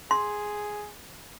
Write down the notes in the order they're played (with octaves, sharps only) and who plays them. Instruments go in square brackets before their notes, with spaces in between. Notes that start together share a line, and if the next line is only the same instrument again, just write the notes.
[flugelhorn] G#4 [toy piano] C6